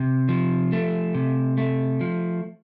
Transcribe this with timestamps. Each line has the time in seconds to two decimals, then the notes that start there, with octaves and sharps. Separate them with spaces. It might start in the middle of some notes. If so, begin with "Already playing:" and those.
Already playing: C3
0.29 F3
0.72 A3
1.15 C3
1.58 A3
2.01 F3